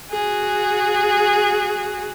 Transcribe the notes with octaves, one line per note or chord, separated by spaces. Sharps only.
F#4 G#4